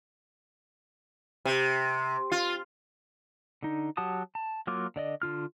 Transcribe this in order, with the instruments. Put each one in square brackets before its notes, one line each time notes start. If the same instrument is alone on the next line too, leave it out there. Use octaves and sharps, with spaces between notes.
[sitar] C3
F4
[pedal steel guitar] D3 D#4
F#3 G4 F#5 A5 D#6
A5
F#3 A#3 F4 D6
D3 D5 D#5
D3 F4 F6